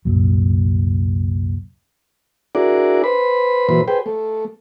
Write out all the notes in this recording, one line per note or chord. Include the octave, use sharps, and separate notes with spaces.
C2 F#2 A#2 F#3
D4 E4 F#4 G#4 A#4 D5
B4 C5 B5
A#2 E3 F#3 B4 C5 B5
G#4 B4 C5 G5
A3